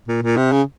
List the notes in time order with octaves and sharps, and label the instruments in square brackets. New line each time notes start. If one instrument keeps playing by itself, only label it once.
[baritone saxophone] A#2
A#2
C3
C#3